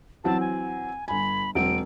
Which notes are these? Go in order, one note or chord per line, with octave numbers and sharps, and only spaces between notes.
E3 F#3 C4 A5
G#5
G1 G#5 B5
E1 F#3 C4 D7